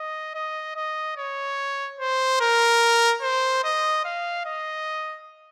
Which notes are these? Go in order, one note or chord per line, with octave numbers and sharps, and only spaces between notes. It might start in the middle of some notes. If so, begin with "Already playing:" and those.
Already playing: D#5
D#5
D#5
C#5
C5
A#4
C5
D#5
F5
D#5